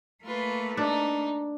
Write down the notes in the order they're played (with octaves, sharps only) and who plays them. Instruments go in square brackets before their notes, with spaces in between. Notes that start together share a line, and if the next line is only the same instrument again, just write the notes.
[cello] A3 A#3 [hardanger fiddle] F4 B4
[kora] D4 [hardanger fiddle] D#4